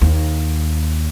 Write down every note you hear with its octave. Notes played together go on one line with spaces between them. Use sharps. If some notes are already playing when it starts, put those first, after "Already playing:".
D#2